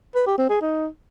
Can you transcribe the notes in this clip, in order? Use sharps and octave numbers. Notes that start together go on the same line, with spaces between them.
B4
G4
C4
G#4
D#4